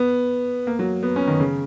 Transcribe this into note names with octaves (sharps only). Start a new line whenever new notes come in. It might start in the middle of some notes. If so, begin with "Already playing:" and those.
Already playing: B3
A#3
F#3
B3
C#4
D#3
C#3